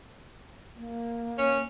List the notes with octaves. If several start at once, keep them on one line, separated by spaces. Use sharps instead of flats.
A#3
C#4